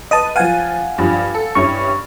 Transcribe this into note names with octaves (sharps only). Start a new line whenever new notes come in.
B4 D#5 A5 D#7
F3 F5 F#5 G#5 D#7
G2 F3
A4
G2 C#4 E4 C#6